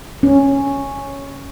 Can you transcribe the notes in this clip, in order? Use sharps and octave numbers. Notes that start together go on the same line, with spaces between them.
C#4